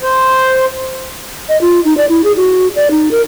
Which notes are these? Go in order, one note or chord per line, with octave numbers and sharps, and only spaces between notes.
C5
D#5
F4
D#4
D5
E4
G#4
F#4
D5
D#4
A#4